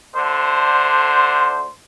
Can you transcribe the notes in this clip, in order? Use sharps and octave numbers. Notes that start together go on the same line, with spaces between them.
D2 D3 C5